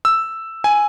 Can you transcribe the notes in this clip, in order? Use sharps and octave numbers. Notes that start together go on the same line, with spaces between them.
E6
G#5